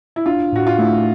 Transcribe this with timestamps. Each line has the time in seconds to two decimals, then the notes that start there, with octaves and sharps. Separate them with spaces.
0.16 E4
0.26 D4 F4
0.53 A2 F#4
0.67 F4
0.79 A3 E4